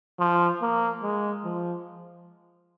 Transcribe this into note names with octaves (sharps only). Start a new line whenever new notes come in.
F3
A#3
G#3
F3